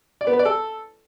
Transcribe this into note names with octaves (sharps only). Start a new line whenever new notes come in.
D5
B3
B4
D5
A4